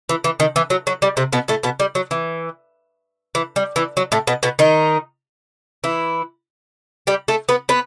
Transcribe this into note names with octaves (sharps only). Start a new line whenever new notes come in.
E3
E3
D#3
E3
F#3
F#3
G3
C3 C4
B2 B3
A2 A3
B2 B3
G3
F#3
E3
E3
G3
E3
F#3
A2 A3
B2 B3
B2 B3
D#3 D#4
E3 E4
G3 G4
A3 A4
B3 B4
B3 B4